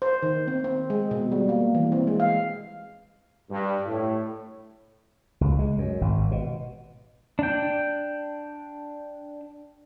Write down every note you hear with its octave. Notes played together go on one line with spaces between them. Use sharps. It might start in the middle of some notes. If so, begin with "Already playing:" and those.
C5
D#3
C4
C4
G#3
B2
G3
A#3
E3
C4
G#3
F5
G2
A2
C#2
G#3
F#2
G#1
B2
D4 G5